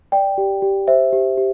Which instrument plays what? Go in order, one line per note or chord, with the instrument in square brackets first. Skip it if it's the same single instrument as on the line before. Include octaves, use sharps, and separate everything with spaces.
[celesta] D5 G5
G4
G4
C5 E5
G4
G4